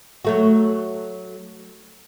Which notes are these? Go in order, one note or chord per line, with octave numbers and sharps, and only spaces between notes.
F#3 A3 F#4